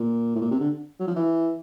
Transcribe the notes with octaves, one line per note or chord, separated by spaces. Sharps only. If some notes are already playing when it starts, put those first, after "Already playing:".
Already playing: A#2
A2
A#2
C3
D3
F#3
F3
E3